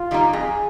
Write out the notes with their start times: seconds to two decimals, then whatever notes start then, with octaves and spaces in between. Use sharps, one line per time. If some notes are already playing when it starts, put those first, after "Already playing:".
Already playing: F4
0.11 D#3 G3 A#3 D#4
0.33 F2 G#4